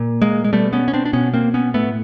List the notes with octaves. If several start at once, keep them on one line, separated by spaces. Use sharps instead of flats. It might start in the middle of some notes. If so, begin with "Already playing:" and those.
Already playing: A#2
G#3 A#3
G#3
B2 G3 A3
B3 C#4
C#4
C4 D4
D4
B2 B3 C#4
A#3 C4
B3 C#4
A2 A3 B3